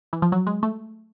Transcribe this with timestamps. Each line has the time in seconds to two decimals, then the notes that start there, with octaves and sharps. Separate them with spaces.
0.13 E3
0.22 F3
0.32 F#3
0.47 G#3
0.63 A3